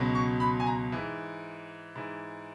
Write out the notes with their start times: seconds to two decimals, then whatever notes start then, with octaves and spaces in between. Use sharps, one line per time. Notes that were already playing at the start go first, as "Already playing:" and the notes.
Already playing: C#2 B2 F#3
0.15 C#6
0.40 B5
0.60 G#5
0.67 A#5
0.92 G#2 E3
1.95 G#2 E3